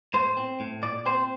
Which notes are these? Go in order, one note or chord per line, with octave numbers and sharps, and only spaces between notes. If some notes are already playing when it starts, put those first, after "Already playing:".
A2 C5
C4
A2
A#2 D5
C4 C5